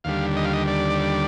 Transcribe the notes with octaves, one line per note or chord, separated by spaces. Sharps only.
D#2 D3 G3 F5
D#5
F5
D#5
D5